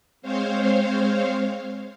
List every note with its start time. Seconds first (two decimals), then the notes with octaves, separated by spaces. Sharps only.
0.22 G#3 C4 C5 C#5 F5